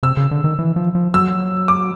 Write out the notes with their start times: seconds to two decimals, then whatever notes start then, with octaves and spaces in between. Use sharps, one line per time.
0.03 C3 E6
0.17 C#3
0.31 D3
0.44 D#3
0.59 E3
0.76 F3
0.95 F3
1.14 F#3 E6
1.68 D6